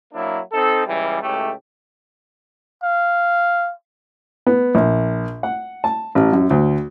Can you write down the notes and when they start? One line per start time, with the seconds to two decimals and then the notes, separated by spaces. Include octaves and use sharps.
0.13 F#3 A#3 D4 E4
0.53 C4 D#4 A4
0.86 C#2 E3 G3
1.22 C#2 A2 A3 G4
2.83 F5
4.47 B3
4.75 A#1
5.43 F#5
5.84 A5
6.15 A1
6.33 F#2
6.50 D2